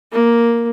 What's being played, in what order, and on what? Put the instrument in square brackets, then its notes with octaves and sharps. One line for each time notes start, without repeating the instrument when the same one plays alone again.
[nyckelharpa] A#3